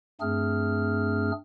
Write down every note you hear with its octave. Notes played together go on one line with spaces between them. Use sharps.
G2 A3 C4 D4 G#4 F6